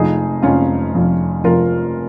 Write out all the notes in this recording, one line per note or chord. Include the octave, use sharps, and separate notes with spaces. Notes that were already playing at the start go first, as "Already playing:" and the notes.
Already playing: F1 F2 F3 D#4 G#4
F1 F2 F3 C#4 F4
F1 F2 F3
F1 F2 F3 F4 A#4